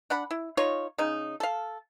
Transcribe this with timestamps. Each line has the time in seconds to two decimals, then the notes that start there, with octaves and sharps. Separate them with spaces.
0.10 D4 F#5 B5
0.31 E4
0.57 D#4 F4 C#5
0.98 C#3 D#4
1.40 A4 F5